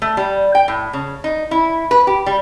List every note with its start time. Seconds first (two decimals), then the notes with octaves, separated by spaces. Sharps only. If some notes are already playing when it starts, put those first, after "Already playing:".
0.02 A3
0.17 G3
0.55 G5
0.68 A2
0.93 C#3
1.24 D#4
1.51 E4
1.91 B4
2.07 G4
2.26 G3